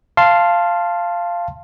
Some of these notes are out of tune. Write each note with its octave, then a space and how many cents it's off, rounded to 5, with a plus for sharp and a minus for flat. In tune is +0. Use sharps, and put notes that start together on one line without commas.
F5 -10 A5 +0 C6 +10